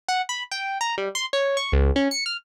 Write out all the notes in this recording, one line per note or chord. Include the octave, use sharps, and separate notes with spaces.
F#5
B5
G5
A#5
G3
C6
C#5
C#6
C#2
C#4
C#7
F6